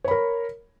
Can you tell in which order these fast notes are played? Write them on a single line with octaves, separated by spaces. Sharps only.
C#5 B5 A#4